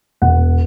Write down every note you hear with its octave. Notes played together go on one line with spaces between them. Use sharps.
E1 F#5